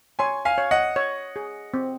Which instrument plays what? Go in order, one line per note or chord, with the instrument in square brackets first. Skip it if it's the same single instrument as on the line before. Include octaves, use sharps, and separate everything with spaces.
[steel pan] C#5 [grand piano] G#5 C6
[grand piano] F5 G#5
[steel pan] C#5
[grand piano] D#5 F#5
[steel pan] C#5
G#4
C4